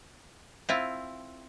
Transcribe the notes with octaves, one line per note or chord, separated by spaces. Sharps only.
C4 E4 F4